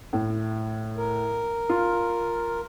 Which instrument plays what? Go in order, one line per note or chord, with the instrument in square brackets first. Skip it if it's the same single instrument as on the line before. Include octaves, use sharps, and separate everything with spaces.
[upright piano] A2
[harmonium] A#4
[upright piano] F4